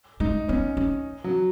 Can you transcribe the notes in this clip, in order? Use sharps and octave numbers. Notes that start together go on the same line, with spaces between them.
G#3 D#4
B3 C#4
C#4
F#3